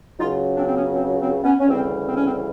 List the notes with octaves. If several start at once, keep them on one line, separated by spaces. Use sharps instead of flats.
C#2 C#3 F#3 D#4 F4
C4 D4
C4
B3 C#4
C4
C4
B3 C#4
C#4
D2 C#3 E3 G3 C4
C4
C#4
C4